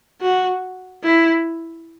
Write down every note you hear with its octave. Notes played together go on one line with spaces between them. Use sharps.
F#4
E4